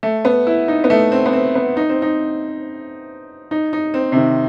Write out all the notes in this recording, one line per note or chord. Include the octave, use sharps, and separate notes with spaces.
A3
B3
E4
D#4
B3
A3
C4
B3
C4
B3
D#4
C4
D#4
D#4
D#4
C4
C3
D#3